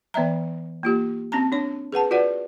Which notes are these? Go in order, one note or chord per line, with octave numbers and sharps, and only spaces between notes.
E3 B3 D5 E5 A#5
A#3 F4 G4
C4 C#4 A5 A#5
D4 C#5
G#4 B4 F#5 A5
F4 F#4 B4 D5 F#5